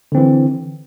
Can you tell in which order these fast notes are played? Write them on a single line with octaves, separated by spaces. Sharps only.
D3 C4 E3